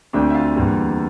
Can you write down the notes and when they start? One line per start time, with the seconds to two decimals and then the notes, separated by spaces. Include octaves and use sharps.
0.13 D2 D3 A3 C4 D4 D5
0.30 E5
0.34 F4 F5
0.56 E2 D3 G3 A#3